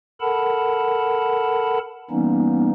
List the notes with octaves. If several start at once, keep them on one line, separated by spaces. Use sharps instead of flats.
A4 A#4 F#5 A5 B5
E3 G3 A#3 B3 C#4 D#4